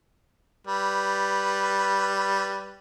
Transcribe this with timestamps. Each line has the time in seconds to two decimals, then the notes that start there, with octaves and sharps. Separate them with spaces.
0.67 G3 B4